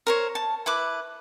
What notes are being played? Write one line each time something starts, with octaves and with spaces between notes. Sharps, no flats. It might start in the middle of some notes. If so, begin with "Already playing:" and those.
A#4 C5 C#5
A5
E4 B4 D6